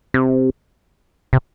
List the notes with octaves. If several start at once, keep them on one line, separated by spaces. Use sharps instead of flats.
C3
C3